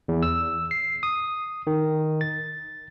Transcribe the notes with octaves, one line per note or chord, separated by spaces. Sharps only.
E2
E6
C7
D#6
D#3
A6